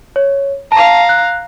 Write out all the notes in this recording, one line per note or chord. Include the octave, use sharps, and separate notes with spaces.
C#5
F5 A5 A#5
F#6